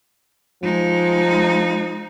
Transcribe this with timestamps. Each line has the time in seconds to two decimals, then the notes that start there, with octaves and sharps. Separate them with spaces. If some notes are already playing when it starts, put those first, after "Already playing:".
0.63 F3 G#3 D#4